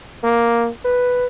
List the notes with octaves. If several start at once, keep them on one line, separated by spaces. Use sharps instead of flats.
A#3
B4